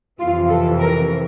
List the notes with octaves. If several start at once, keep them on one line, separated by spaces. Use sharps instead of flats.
F2 C3 E3 F4
A4
A#4